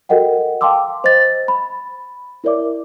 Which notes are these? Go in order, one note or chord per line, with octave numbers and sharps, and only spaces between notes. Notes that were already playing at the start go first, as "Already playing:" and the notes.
F#4 A4 A#4 D#5 F#5 G5
F5 G5 A5 C6 D6 E6
C5 D#5 A6
B5
E4 A#4 C#5 D5 E5 D6